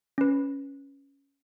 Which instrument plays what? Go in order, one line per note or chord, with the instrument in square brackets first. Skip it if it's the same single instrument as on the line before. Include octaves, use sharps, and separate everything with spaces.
[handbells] C#4 B4